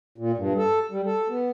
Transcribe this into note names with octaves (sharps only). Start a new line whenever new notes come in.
A#2
G2
A4
G3
A4
B3